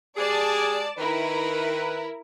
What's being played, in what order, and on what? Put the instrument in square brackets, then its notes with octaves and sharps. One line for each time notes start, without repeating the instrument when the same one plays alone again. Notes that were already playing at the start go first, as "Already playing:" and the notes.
[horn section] G#3 G4 G#4 [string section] D5 A5
[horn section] D#3 B4 [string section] E4 A#4